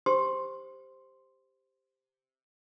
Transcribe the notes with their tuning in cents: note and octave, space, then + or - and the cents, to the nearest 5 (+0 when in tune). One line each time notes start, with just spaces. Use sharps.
G4 +10 C5 +0 C6 +0